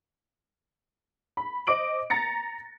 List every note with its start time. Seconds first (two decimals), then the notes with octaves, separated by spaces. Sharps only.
1.37 B5
1.67 C5 D#5 D6 D7 F#7
2.10 A#5 A6 A#6 C#7